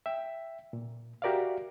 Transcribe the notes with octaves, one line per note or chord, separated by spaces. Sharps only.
E5 G5
A#2
F#4 G4 A#4 D5 E5 F5